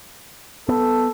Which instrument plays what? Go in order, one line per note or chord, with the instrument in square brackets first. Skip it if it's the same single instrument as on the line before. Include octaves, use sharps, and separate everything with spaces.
[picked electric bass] B3 [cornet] A4